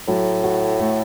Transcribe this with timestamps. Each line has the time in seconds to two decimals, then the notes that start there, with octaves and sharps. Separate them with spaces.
0.08 A2 F#3
0.44 F#4
0.79 A3